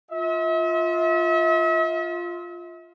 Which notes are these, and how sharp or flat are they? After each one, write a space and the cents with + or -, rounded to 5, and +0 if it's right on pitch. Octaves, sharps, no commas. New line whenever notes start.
F4 +0 E5 -40